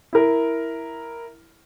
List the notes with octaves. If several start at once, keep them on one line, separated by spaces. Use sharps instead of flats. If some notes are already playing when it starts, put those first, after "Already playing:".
E4 A#4